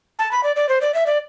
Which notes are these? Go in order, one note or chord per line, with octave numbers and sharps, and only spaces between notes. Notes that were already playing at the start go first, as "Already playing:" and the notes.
A5
B5
D5
D5
C5
D5
E5
D5